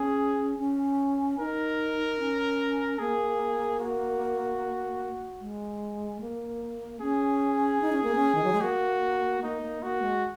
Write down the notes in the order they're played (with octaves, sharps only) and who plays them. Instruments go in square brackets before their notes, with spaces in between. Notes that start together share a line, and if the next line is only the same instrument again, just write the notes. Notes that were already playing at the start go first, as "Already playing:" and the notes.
Already playing: [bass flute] C#4 [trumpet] G#4
[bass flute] C#4
[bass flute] D#4 [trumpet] A#4
[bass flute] C#4
[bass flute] A#3 [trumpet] G#4
[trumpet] F#4
[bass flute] G#3
A#3
[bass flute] C#4 [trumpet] G#4
[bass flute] D#4
C#4
A#3
C#4
D#3
F#3
G#3
[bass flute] A#3 [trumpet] F#4
[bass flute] A#3 [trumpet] D#4
[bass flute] A#3
[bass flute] A#3 [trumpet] F#4
[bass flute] G#3